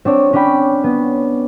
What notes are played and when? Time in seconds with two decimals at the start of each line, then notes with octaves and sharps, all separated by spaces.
0.05 C4 D4 C#5
0.33 C#4 D4 C5 G5 B5
0.84 B3